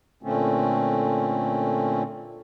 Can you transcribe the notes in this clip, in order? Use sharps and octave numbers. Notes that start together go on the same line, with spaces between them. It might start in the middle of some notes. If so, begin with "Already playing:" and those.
A#2 D3 A3 C4 C#4